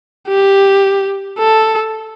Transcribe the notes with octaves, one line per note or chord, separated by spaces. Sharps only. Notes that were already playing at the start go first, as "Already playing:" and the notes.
G4
A4